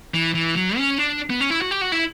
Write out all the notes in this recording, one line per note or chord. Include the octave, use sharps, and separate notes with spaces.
E3
E3
F#3
C#4
D4
B3
C#4
E4
F#4
G4
F#4
E4